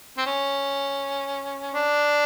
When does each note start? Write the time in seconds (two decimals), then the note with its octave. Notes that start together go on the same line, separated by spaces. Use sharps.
0.18 C4
0.26 C#4
1.74 D4